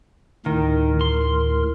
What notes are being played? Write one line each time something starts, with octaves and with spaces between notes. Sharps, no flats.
D2 A2 D#3 A#4
C6